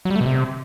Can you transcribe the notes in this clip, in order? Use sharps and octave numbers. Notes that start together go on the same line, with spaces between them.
F#3
G3
A3
B2
C3